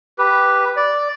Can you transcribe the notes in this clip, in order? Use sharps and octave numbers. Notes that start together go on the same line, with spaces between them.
G4 B4
D5